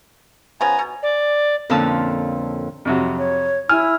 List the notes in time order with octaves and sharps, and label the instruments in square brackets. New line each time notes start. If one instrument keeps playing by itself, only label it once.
[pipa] C#3 F3 B3 [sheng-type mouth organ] G#5 A#5
[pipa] B2
[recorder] D5
[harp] F2 A#2 D3 C#4 A5 E6
[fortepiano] F2 C3 F#3
[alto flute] C#5
[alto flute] E4 [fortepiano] G#5 [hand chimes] F6